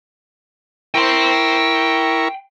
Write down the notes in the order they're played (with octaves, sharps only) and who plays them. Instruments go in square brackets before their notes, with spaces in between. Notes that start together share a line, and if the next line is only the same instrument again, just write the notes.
[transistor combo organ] E4 A#4 C#6 [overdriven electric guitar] G5 C6